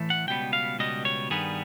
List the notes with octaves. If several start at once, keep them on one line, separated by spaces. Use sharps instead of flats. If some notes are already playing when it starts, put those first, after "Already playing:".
Already playing: A2 E3 A3
F#5
C#2 B2 G3 B3 G5
F5
C#2 B2 G3 B3 D#5
C#5
G2 D#3 G3 B3 G#4